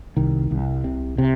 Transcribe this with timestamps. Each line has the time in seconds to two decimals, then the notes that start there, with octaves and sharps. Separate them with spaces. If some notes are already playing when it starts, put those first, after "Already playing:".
0.16 C2 D#3
0.51 C2
0.84 C3
1.18 C3